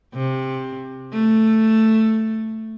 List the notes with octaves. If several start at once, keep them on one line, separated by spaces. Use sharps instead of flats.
C3
A3